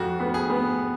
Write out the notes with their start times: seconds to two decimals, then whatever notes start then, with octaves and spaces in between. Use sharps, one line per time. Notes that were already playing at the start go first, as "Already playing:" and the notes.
Already playing: F2 F#4
0.20 B3
0.34 G#4
0.50 B3